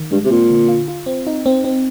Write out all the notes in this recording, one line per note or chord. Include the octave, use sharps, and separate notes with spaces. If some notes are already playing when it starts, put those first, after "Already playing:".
Already playing: D#3
G2 G#3
C3
A#2 C4
D3
F4
F4
C4
D#4
C4
C4